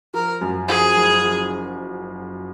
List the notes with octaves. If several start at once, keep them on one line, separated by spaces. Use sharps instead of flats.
F3 A#4
F#2
F3 G#4
F#1
F3